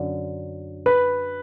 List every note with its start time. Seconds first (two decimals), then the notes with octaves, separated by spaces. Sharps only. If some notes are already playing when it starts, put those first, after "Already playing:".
Already playing: F#2 D3
0.86 B4